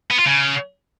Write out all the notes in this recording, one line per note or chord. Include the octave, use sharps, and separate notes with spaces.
B3
F4
C#3